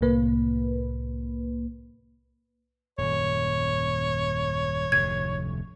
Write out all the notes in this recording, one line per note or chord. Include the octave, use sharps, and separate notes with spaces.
C2 A2 C3 A#3 B4
D#1 F#2 C#5
F1 D2 A2 G#6